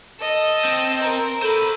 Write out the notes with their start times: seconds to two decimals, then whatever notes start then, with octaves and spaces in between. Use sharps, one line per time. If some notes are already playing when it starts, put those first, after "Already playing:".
0.19 A4 D#5
0.65 C4
1.02 A#4 A#5
1.42 A4 C5 B5